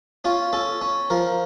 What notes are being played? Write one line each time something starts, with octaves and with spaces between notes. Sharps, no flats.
C#4 F4
C#4 A4
C#4
F3 A#4